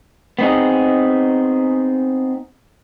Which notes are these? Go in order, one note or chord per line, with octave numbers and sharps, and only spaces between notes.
B3 C4 D#4 G#4